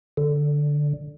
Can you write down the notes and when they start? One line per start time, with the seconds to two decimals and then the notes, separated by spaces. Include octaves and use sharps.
0.17 D3